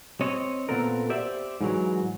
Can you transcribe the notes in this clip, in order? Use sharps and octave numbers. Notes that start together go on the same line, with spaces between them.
C4 C#5 D#5
A#2 C#3 B3 C4 A4 A#4
G4 C5 D5 E5
G#2 E3 F#3